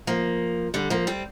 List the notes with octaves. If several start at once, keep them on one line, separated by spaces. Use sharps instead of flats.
F3 A#3
D3 G3
F3 A#3
G3 C4